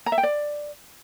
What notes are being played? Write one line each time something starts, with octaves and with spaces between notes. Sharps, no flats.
A#5
E5
G5
D5